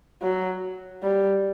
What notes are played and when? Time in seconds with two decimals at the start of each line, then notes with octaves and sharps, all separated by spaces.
0.22 F#3
1.03 G3